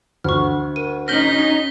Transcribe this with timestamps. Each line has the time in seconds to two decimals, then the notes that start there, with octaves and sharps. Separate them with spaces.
0.24 D2 C#6 F6
0.76 A#4 D#7
1.08 C#4 D#4 F6 G6 A#6 B6 F#7 G7